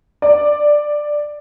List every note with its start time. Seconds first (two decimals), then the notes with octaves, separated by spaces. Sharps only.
0.22 D5